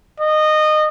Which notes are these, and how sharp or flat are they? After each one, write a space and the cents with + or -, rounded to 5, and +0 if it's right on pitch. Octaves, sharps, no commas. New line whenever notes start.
D#5 -20